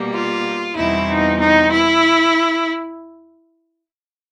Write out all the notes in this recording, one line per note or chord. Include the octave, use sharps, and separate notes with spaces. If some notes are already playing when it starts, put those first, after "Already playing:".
Already playing: B2 G3 A#3
F4
E2 B2 G3 C4 D#4 E4
D#4
D#4
E4